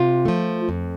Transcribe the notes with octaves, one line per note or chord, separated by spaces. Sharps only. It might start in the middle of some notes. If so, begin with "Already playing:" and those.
Already playing: C3 F4
F3 A3
F2